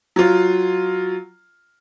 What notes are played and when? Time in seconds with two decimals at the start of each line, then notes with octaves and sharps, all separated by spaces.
0.16 F#3 F4